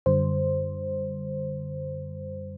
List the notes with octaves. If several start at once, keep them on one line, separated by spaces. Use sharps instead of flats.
F#2 D3 G3 C5